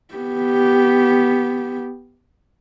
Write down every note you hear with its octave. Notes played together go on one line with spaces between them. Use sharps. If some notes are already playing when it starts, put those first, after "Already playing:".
B3 G4